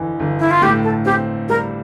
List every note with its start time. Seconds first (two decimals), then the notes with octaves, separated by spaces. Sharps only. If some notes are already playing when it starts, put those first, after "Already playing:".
Already playing: G1 F2 E3
0.20 G1
0.39 E4
0.51 F4
0.62 A2 G4
0.83 A4
1.05 C4 G4
1.49 G3 A#4